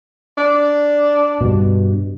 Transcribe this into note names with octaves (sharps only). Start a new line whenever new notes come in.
D4
G2 B2